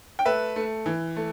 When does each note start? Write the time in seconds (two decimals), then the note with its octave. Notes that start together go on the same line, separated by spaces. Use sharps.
0.19 G5
0.25 A3 B4 E5
0.56 A3
0.86 E3
1.16 A3